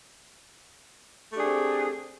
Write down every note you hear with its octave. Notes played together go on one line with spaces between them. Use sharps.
A3 C4 D4 G4 G#4